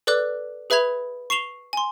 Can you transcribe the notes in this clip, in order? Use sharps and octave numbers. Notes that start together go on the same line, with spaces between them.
A4 B4 D5 D6 F#6
G#4 B4 E5 B5 G#6 F7
C#6 C7 E7 F7 G7
G#5 C6